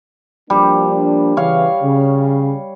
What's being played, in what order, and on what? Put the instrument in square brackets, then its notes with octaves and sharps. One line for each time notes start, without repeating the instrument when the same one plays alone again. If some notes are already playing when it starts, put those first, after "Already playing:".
[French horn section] F3 A#3 D4 [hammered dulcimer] G3
[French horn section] C#3 E3 [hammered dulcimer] C#5 F5
[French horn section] C#3